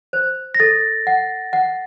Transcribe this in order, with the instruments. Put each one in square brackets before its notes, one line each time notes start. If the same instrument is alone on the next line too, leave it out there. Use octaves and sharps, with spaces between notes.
[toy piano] C5
[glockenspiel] A#6
[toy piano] A4 [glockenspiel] A6
[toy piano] F#5
F#5